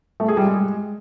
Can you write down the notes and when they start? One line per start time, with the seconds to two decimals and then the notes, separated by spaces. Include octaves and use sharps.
0.20 A3
0.28 G#4
0.37 G3
0.46 G#3